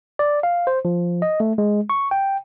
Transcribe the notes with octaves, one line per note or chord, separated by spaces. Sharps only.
D5
F5
C5
F3
D#5
A3
G#3
C#6
G5